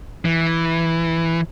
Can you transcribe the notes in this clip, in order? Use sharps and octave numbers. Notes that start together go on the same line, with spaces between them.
E3